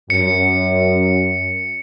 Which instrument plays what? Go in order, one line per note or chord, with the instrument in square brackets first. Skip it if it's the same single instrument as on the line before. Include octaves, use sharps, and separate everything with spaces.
[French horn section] F#2 [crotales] C#7